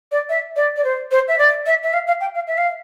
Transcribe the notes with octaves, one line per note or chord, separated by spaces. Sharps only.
D5
E5
D5
D5
C5
C5
E5
D5
E5
E5
F5
F5
G5
F5
E5
F5